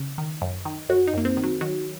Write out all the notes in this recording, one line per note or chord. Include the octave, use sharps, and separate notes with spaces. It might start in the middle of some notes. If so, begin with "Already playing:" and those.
Already playing: C#3
D#3
F#2
D#3
F#2 F#4
D#4
F#2 A#3
C4
D#3
F#3
D#3 F#3